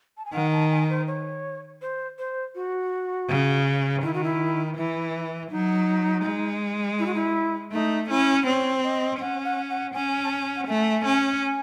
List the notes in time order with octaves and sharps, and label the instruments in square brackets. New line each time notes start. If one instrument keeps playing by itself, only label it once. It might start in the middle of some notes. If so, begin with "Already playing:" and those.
[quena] A5
G#5
[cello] D#3 [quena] F#5
[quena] A5
G#5
C5
C#5
C5
C5
F#4
[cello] C#3
[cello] D#3 [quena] E4
[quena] F#4
E4
[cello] E3 [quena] E4
[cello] F#3 [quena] D#4
[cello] G#3
[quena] E4
F#4
E4
[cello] A3 [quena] D#4
[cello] C#4 [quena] E4
[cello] C4 [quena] C#5
[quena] D#5
[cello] C#4 [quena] F#5
[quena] F#5
F#5
[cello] C#4 [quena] G#5
[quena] A5
G#5
F#5
[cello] A3 [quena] G#5
[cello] C#4
[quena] G#5